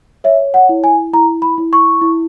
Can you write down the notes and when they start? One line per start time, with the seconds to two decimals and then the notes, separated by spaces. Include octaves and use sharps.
0.24 C#5 E5
0.54 F#5
0.69 E4
0.84 G#5
1.13 E4 A#5
1.42 B5
1.58 E4
1.73 C#6
2.02 E4